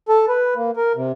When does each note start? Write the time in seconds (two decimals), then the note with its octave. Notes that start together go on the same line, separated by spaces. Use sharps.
0.09 A4
0.29 B4
0.56 A#3
0.77 A#4
0.96 C3